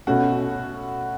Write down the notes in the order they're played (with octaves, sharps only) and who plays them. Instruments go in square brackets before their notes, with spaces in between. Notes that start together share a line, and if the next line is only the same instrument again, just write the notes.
[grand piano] B2 A3 C#4 [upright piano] F#4